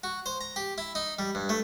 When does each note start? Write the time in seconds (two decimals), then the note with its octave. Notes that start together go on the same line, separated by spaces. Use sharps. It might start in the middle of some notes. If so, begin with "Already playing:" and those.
0.04 F#4
0.26 C5
0.41 A#5
0.56 G4
0.78 E4
0.95 D#4
1.19 G3
1.35 G2
1.49 A3